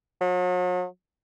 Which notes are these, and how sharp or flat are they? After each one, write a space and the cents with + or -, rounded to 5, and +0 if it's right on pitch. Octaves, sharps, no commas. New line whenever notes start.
F#3 -40